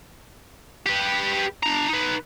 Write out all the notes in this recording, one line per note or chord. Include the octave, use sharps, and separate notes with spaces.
G4 B4
D4 A#5
D#4 B4